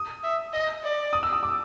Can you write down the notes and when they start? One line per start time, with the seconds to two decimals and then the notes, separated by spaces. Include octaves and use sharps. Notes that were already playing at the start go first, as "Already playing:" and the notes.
Already playing: D#6
0.23 E5
0.53 D#5
0.83 D5
1.13 D#6
1.23 E6
1.33 D#6
1.43 D6